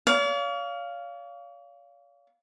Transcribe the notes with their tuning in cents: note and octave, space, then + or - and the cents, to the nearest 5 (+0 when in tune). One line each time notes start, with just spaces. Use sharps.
C#5 +45 F5 -5